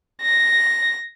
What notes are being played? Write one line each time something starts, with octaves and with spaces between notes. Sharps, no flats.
A#6